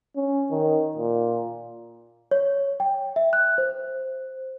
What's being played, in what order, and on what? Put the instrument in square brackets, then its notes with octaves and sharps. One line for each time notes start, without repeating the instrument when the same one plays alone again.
[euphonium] C#4
D#3
A#2
[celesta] C#5
G5
E5
F#6
C5